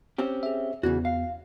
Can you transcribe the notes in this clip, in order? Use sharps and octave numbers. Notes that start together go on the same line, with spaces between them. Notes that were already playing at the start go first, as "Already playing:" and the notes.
C4 C#4 G4
G#4 E5
E2 C#3 E3 B3 F#4
F5